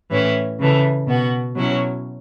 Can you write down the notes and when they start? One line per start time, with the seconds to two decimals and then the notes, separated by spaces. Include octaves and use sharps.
0.11 A2 E3 C#4 E4
0.59 C#3 E3 A3
1.07 B2 B3 F#4
1.55 B2 F#3 C#4 E4